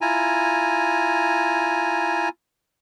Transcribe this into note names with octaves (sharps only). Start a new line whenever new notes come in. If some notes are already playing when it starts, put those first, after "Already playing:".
E4 F4 G#5 A#5